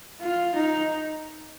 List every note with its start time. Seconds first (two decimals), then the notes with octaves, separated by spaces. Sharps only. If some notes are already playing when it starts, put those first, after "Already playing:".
0.21 F4
0.55 D#4